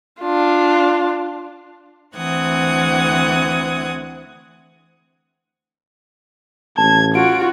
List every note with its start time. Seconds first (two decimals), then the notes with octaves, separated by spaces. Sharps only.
0.21 D4 F4
2.16 D2 E3 C4 F#5 D#6 G#6
6.78 A1 A5 G#6
7.15 F4 F#4 D7